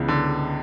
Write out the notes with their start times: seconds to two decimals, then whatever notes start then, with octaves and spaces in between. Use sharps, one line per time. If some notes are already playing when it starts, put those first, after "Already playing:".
Already playing: C#2 C#3 E3 B3
0.08 D3